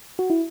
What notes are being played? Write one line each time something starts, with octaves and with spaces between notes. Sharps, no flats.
F#4
E4